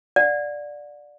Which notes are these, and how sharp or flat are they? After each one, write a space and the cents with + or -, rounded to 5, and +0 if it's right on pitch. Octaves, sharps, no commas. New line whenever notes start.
D5 +0 F#5 -40